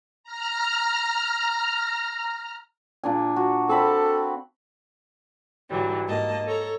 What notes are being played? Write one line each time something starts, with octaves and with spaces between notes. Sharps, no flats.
A#5 F6
A#2 D4 G#5
F#4
C4 A4 B5 D6
G#2 D3 E3 F#3 G3
G#2 A#3 D#5 A5
A4 C#5 A#5